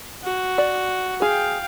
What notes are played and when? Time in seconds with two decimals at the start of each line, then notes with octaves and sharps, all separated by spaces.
0.24 F#4
0.58 D5
1.22 G#4 F5 G5